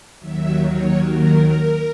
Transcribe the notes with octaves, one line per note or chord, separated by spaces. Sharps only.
D#2 D#3 F#3 E5
C#5
A#4
A#4